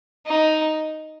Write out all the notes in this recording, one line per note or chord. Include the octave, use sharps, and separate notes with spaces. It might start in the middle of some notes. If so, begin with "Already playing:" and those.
D#4